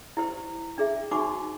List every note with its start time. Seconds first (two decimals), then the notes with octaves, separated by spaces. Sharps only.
0.17 E4 G4 C5
0.78 D4 G#4 E5
1.11 D#4 F#4 C5 G#5 C#6 D6